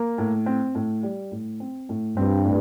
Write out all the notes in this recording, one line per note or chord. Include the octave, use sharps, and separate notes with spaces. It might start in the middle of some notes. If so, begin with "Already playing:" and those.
Already playing: A#3
A2
C4
A2
G3
A2
C4
A2
G2 C4
A2